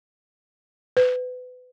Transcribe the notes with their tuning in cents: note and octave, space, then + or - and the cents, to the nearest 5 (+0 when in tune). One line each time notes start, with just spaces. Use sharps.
B4 +30